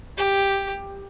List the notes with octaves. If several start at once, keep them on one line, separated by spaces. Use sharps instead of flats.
G4